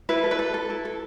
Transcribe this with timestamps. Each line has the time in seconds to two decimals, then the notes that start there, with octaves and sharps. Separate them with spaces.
0.09 E4 B4
0.24 A4
0.31 B4
0.39 A4
0.54 A4
0.70 E4
0.85 A4